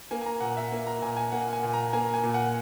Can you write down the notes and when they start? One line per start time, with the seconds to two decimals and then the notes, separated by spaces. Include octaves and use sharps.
0.11 A#3 G#5
0.22 G#5
0.26 A#5
0.40 A#2 F#5
0.57 E5
0.72 A#3
0.87 A#5
1.02 A#2 G#5
1.17 G#5
1.32 A#3 F#5
1.53 G#5
1.63 A#2
1.73 A#5
1.93 A#3 G#5
2.14 G#5
2.24 A#2
2.34 F#5